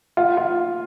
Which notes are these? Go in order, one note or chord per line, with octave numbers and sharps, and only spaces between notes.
F4
F4